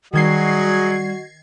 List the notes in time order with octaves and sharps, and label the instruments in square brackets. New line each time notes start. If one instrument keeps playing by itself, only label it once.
[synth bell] D#3 G#6 C7 [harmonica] F#3 G#4 D#5 [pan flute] G3 [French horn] F#4